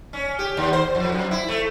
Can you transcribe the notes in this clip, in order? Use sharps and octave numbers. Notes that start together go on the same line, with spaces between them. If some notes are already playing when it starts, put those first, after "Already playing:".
C#4
G4
D#2
C5
F2
F#2
E4
A3